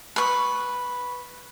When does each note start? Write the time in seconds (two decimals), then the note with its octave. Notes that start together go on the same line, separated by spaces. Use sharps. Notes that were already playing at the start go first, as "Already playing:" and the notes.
0.16 B4 C#6